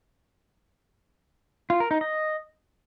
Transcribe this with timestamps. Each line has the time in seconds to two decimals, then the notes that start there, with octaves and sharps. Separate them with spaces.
1.70 F4
1.80 A#4
1.91 D#4
2.01 D#5